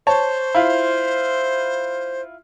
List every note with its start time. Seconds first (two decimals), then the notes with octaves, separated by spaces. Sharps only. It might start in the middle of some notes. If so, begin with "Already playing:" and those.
0.07 C5 C#5 A5
0.55 E4 F4